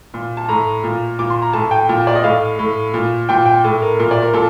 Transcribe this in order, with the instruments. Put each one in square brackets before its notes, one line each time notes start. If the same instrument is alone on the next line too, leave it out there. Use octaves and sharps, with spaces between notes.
[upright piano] A#2
A5
A2 A#5
A#2
A#2 D6
C6
A#5
A2 A5
G5
A#2
D5
D#5
A2 F5
A2
A#2
A#2 G5
G5
A2
A#4
A#2 A#4
D5
A#4
A#2 A4